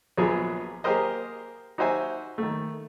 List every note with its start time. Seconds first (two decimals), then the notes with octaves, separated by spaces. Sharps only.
0.18 A#1 F3 F#3 B3 G#4
0.84 A#3 G4 G#4 A#4 C5 D#5
1.78 D#4 F#4 G4 C5 E5 G#5
2.38 D#3 A3